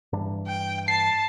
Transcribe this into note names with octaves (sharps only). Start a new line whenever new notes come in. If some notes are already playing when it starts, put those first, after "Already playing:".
G2 E3 D4
G5
A5 C7